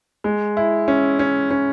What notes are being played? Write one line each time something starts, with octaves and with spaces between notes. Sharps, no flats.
G#3
E4
C#4
C#4
C#4